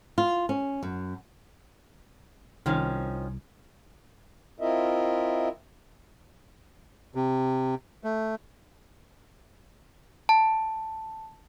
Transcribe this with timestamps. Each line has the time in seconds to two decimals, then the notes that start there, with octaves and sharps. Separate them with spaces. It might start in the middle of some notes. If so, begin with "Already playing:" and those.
0.18 F4
0.49 C#4
0.83 F#2
2.66 C2 D#3 F3 C#4
4.60 C4 E4 F4 A#4 D#5 E5
7.15 C3
8.04 A3
10.29 A5